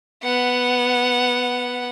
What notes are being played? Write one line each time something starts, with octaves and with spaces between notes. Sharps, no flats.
B3 F#5